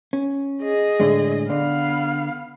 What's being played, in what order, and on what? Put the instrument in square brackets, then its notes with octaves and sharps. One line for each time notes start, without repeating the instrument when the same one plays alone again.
[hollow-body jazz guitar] C#4
[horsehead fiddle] G#4 D#5
[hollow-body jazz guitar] A2 D3 G#3
[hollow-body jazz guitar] D3 [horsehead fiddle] B3 F5